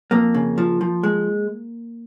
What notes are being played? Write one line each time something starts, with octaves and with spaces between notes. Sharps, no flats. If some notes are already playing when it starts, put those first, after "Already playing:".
F2 A#3
C#3
F3
F3
G#3